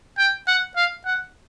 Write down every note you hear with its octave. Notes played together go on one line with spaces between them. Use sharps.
G5
F#5
F5
F#5